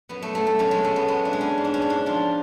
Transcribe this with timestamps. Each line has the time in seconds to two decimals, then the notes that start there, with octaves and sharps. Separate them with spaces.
0.09 F#2 B3
0.22 A3
0.35 F#2 A3
0.47 A3
0.59 F#2 C#4
0.71 G#3
0.83 F#2 A3
0.96 B3
1.08 G#3 B3
1.25 D4
1.33 G#3
1.41 C#4
1.58 G#2
1.64 D4
1.74 C#4
1.82 G#2
1.90 D4
2.06 F3 F4